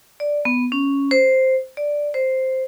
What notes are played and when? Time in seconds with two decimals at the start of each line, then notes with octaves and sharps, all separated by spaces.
0.20 D5
0.45 B3
0.72 C#4
1.11 C5
1.77 D5
2.14 C5